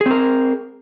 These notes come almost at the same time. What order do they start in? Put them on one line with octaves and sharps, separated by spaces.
G#4 C4 A#4